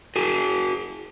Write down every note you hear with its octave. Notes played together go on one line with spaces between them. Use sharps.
F#4 G#4